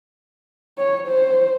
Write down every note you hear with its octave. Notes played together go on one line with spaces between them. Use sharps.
C#5
C5